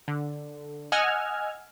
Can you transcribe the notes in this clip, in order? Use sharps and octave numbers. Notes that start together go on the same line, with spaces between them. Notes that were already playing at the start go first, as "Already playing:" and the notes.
D3
D#5 F#5 G#5 E6 F6 G#6